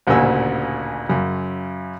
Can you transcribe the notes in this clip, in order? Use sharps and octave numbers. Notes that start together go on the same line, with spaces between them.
A1 D2 A#2 C#3 G#5 E6
F#2 C#3